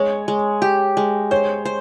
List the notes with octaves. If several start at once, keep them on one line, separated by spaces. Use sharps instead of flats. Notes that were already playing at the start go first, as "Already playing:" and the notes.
Already playing: G#3 C#5
G#3
G4
G#3
C5 C#5
C5